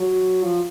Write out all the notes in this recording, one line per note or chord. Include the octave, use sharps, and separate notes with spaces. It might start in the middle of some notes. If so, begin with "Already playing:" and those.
Already playing: F#3
F3